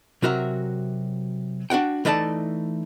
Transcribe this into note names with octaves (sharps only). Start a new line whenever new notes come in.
C3 F#3 F#4 A#4 E5
D4 F#4 F#5 G5
E3 A3 D#4 D5 F5 A5